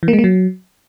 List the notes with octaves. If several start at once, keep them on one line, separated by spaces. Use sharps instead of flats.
E3
A#3
G#3
A#3
F#3